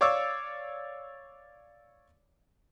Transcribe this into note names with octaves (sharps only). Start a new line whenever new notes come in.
C#5 D5 F5 C#6 D6 E6